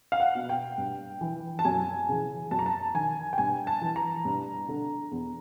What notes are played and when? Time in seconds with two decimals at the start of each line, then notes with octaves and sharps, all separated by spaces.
0.12 F5
0.20 F#5
0.35 B2
0.49 G5
0.78 G2
1.21 E3
1.59 A5
1.65 F#2 G#5
2.09 C#3 E3
2.51 F#2 A5
2.59 A#5
2.66 A5
2.94 D#3 G#5
3.33 G5
3.38 G2 G#5
3.67 A5
3.82 E3
3.96 A#5
4.25 G2
4.68 D3
5.11 E2